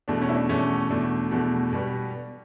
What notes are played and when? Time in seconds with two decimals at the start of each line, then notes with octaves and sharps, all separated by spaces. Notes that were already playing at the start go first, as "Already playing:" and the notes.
0.08 E2 B2 A3 D4
0.22 C#4
0.29 E4
0.35 D4
0.49 E2 B2 A3 C#4
0.90 E2 B2 A3 D4
1.31 E2 B2 A3
1.73 B2 G3 B3